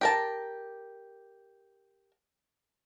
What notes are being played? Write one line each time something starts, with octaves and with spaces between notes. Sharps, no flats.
G4 A#4 A5